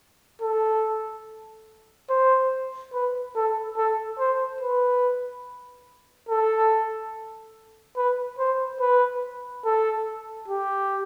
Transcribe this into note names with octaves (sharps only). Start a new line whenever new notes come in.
A4
C5
B4
A4
A4
C5
B4
A4
B4
C5
B4
A4
G4